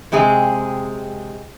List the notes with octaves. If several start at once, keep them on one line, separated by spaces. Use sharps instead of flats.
C3 G#3 C4 G#4